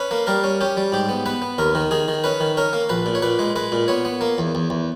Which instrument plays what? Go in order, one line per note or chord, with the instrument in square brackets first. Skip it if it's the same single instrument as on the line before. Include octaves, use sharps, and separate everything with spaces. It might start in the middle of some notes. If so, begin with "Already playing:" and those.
Already playing: [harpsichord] C#4 B4
A#3
G3 A#4
C#4
C#4 G4
G3
G#2 G4
B3
B3 B4
B3
D#2 A#4
D#3
D#3 G#4
D#3
C#4 B4
D#3
C#4 A#4
A#3
A#1 B4
A#2
C#5
A#2 B4
G#3
G#3 B4
A#2
B3 C#5
B3
A#3
E2
E2
E2